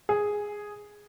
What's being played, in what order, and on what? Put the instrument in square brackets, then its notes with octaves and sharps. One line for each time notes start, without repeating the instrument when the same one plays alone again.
[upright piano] G#4